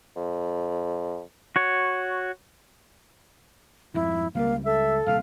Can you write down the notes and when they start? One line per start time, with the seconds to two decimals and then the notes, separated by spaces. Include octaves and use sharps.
0.16 F2
1.56 F#4 C#5
3.94 F2 G#2 E4
4.35 C#2 F#3 G3 A#3 F5
4.65 A4 E5
5.06 D#1 C2 C3 F5